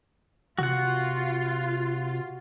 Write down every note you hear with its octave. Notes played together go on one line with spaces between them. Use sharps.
C3 F4 F#4 F#5